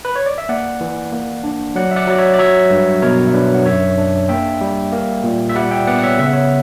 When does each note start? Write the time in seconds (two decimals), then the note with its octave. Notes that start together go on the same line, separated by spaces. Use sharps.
0.05 B4
0.16 C#5
0.26 D5
0.38 E5
0.49 A#3 D5 F#5
0.81 E3
1.12 A#3
1.44 D4
1.75 F#3 D5 F#5
1.91 E5
1.96 D5 F#5
2.07 F#3 D5
2.18 C#5 E5
2.34 D5
2.39 F#3 C#5 E5
2.70 G2
3.02 B2 A#4 C#5
3.27 E5
3.34 D4 B4 D5
3.54 F#5
3.65 F#2 C#5 E5
3.98 D4
4.29 A#3 E5 G5
4.61 G3
4.92 A#3
5.24 A#2
5.49 E5
5.56 G3 D5 F#5
5.71 E5 G5
5.87 B3 D5 F#5
5.99 F#5
6.03 C#5 E5
6.19 C#3 E5
6.26 F#5
6.33 C#5 E5